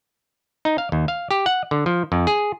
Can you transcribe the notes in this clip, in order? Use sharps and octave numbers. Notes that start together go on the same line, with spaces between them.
D#4
F5
D#2
F5
G4
F#5
D3
F3
F2
G#4